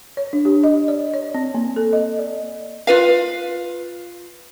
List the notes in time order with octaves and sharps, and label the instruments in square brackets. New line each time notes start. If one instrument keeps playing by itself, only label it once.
[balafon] C#5
D4
G4
D#5
D5
C#5
C4
A#3
A4
D#5
D5
[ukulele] F4 B4 F5